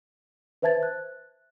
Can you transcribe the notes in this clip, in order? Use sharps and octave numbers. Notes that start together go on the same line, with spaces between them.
B4 C5 E5 A5 G#6 A6
F#6